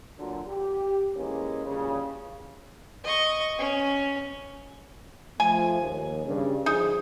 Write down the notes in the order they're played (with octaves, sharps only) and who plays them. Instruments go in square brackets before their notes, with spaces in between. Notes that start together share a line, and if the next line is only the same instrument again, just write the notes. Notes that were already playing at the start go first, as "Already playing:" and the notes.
[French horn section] A#2 D3 F#3
G4
G#2 E3 G#3 A#3 C#4
G2 A#2 C#3
[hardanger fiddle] D#5 C#6
C#4
[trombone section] F3 A3 [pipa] G#5
[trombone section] D#2
G2 C#3
[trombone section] D3 F3 G#4 [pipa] D#4